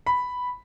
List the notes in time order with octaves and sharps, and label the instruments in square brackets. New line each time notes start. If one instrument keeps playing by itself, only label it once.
[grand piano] B5